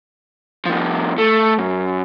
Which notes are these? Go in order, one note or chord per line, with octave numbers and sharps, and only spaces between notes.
C2 F3
A3
F#2